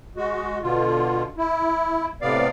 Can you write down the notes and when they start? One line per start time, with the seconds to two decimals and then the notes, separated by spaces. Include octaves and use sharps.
0.17 G#3 F#4
0.62 B2 D3 F4
1.37 E4
2.22 A2 C3 B3 D5 F5